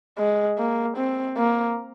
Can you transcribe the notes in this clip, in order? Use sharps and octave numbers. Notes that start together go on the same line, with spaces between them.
G#3
A#3
C4
A#3